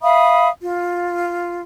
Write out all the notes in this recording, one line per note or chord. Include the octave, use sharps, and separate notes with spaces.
E5 F5 B5 D#6
F4